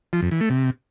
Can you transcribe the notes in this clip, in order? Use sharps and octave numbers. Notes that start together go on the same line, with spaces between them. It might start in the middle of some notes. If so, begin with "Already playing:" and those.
F3
F2
E3
A3
C3